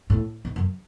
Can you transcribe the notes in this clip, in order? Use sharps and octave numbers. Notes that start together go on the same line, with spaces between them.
A2
G#2
F#2